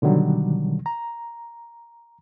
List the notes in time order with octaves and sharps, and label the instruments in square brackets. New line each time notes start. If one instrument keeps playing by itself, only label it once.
[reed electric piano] B2 D3 D#3 F#3 G3
A#5